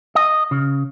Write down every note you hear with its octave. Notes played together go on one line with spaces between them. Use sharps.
D#5
C#3